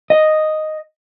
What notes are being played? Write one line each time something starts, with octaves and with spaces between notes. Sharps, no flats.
D#5